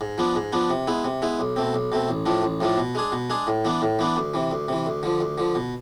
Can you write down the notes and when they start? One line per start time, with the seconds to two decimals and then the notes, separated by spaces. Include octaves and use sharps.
0.01 G#2
0.18 F3 B3 D4
0.35 G#2
0.52 F3 B3 D4
0.70 C3
0.87 G#3 B3 E4
1.04 C3
1.22 G#3 B3 E4
1.39 B1
1.56 B2 A3 C4
1.74 B1
1.92 B2 A3 C4
2.09 A1
2.26 A2 F3 A3 D4
2.43 A1
2.61 A2 F3 A3 D4
2.77 B2
2.95 G#3 D4 G#4
3.12 B2
3.30 G#3 D4 G#4
3.47 A2
3.65 E3 B3 D4
3.82 A2
3.99 E3 B3 D4
4.17 D2
4.34 C3 E3
4.51 D2
4.68 C3 E3
4.86 D2
5.03 D3 F3
5.21 D2
5.38 D3 F3
5.55 B2